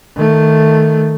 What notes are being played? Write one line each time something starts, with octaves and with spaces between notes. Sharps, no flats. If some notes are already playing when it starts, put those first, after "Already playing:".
D#3 A3